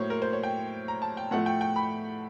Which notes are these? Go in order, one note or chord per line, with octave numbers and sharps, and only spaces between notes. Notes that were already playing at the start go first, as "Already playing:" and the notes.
Already playing: A2 F#3 A#3 A#4 C5 C#5
A#4
C5
C#5
G5
A#5
A5
G5
A2 F3 A3 F#5
G5
G5
B5